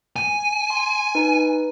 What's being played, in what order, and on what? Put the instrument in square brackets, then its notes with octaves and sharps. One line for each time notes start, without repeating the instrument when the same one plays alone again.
[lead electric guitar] G#5
[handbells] C6
D#4 B4